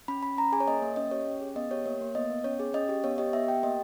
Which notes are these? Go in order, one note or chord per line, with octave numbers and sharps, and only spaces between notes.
C#4 B5
C#4 B5
C#4 A#5
G#4 G#5
C#5
A#3 D#5
A#3
C#4 D#5
G4 C#5
C#4
G#4
B3 D#5
G4 C#5
A#3 C#5
A#3
B3 D#5
B3
C#4 C#5
G#4
C#4 D#5
G4
B3 C#5
G4 D#5
B3 E5
G4 G5
A#3 D#5